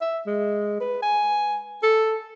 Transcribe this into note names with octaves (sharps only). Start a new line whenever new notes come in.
E5
G#3
B4
G#5
A4